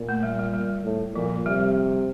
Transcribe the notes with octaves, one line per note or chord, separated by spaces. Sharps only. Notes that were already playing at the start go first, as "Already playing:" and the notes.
Already playing: A#2
A3
G3
G3
G3
A2
A#2 F3
F3
C3 G3